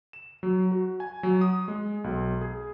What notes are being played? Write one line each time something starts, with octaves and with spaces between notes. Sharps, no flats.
E7
F#3
F#4
G#5
F#3
D#6
G#3
B1
G#4